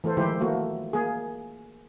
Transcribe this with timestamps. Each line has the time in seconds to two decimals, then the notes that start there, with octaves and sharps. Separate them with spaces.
0.04 E3 A3 A4 C5
0.17 D#3 F3 G#3 E4 G4 C5
0.40 A3 A#3 F#4
0.93 A#3 G#4